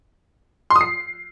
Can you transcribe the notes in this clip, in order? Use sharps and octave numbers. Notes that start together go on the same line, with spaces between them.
C6
D#6
C7